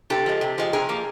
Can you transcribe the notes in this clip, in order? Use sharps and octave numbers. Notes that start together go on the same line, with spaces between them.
C3 G4 A4
F3 G#3
C3
F3 G#3
C3 G#4 A#4
F3 A#3